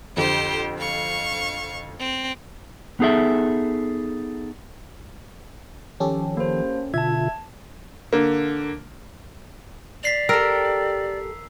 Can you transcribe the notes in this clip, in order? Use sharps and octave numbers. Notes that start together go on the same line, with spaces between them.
F2 D3 G4 C5
F5 C#6
C4
B3 D#4 G#4 A4 E5
D#3 F3 C#4 G4 A4
A#3 C5
B2 D3 F4 E5 A5 G#6
D3 A#3
D5 B6 C7 F7
G4 A4 A#4 E6